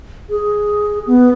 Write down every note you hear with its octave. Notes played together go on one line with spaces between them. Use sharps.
G#4
B3